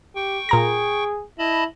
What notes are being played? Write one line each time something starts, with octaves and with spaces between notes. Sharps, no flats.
G4 G5 C#6
A#2 G#4 A#5 A#6
E4 D#5 A5 B5